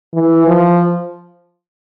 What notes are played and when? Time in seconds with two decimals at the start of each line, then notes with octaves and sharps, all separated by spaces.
0.14 E3
0.47 F3